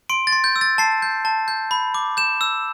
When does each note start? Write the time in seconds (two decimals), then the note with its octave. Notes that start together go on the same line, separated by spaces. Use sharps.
0.09 C6 D7
0.27 A6
0.32 C6
0.44 G6
0.56 E6
0.61 A6
0.78 A5 C7
1.02 G6
1.25 A5
1.48 G6
1.71 B5
1.94 D6
2.17 G6 E7
2.41 E6